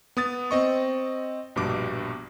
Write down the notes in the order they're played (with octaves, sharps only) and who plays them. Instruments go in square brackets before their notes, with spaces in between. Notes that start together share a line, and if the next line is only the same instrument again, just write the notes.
[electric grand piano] B3 D#6 A6
C4 D#5 C#6
A#1 G2 B2 D6